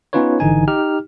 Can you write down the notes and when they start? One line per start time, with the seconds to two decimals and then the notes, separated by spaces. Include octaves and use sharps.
0.13 B3 C#4 D#4 F4 B4 C#5
0.40 G#1 D3 E3 D#4 G#5
0.67 D#4 G4 F6